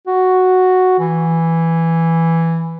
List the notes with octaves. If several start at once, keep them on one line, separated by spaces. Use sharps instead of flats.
F#4
E3